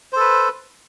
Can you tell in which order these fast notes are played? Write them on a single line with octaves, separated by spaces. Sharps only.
C5 A4 B4